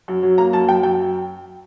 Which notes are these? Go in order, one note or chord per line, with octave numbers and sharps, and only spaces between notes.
F#2
F#3
A#3 A#5
F#2 A5
F#2 G5
F#2 G5